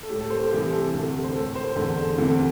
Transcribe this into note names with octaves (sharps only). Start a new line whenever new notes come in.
A4
A2 A3 G4
A4
C5
G4
C2 C3 E3 G4
A4
D2 C3 A3 G4
C5
A2 A3 A4
C5
E2 D3 A3
D2 C3 E3 A3